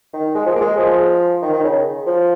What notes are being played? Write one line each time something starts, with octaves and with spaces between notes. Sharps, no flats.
D#3
G#3
F3
A#3
G#3
F3
D#3
D#3
C#3
F3